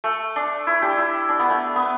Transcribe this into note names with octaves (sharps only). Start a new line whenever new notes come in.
A3
D4
E4
D4 G4
E4
D4
B3
A3
B3